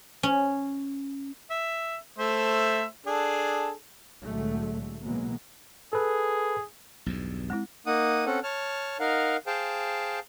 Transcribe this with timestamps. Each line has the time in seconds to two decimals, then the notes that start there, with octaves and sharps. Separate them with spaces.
0.23 C#4
1.50 E5
2.18 A3 C5 E5
3.07 D4 G#4 A4
4.24 C2 A2 D3 F#3 G#3 A3
5.02 B2 E3 F#3 G#3 A#3 B3
5.93 G#4 A4 B4
7.06 B1 E2 G2
7.50 G#3 C4 E4
7.86 A#3 D#4 F#5 D#6
8.26 C4 C#4 A4 F#5
8.43 C#5 A5 F6
9.00 D#4 A#4 F5 F#5
9.47 G#4 C5 F5 G5 A5